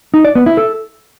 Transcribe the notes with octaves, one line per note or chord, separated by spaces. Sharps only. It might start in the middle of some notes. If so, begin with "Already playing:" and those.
D#4
D5
B3
E4
A4